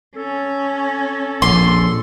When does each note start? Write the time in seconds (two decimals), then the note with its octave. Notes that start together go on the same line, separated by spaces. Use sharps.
0.16 C#4 A4
1.42 A#1 C6